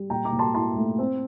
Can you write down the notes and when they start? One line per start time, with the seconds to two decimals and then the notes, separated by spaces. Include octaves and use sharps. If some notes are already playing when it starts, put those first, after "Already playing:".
Already playing: G3
0.10 A#2 G5 A#5
0.25 A#5 D6
0.32 A#2
0.39 A5 C6
0.54 E4 A5 C6
0.76 A3
0.99 C4